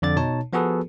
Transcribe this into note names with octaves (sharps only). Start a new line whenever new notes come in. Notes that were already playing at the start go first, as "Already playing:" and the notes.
F2 D3 D5 A6
B2 D#4 C#5 A5
F3 B3 F#4 G#4 A4 B4